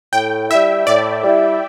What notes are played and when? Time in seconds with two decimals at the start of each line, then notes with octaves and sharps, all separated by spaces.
0.13 A2 G5
0.50 G3 E4 E5
0.87 A2 D5
1.23 G3 E4